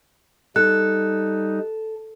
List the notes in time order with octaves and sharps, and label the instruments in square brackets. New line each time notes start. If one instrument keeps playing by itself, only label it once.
[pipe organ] G3 D#4 [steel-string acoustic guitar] A4 [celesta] F#6